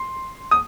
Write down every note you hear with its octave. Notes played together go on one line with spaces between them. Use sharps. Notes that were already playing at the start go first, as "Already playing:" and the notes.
Already playing: C6
D#6